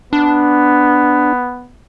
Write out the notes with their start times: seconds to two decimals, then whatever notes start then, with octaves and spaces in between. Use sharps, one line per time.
0.13 B3 D4